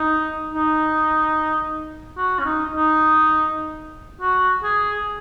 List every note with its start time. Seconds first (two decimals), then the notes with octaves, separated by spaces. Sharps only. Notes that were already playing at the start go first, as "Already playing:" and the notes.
Already playing: D#4
0.54 D#4
2.17 F#4
2.40 C#4
2.45 D#4
2.73 D#4
4.21 F#4
4.63 G#4